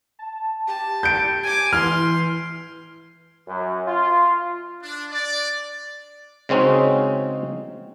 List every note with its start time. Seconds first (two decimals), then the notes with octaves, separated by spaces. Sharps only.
0.19 A5
0.68 G4 A5
1.03 G6 D7
1.43 G#5 D6 G#6
1.73 E3 C6 F6
3.47 F#2
3.87 F4
4.82 D4
5.11 D5
6.49 C#3 G#3 C4 C#4 D#4 F#4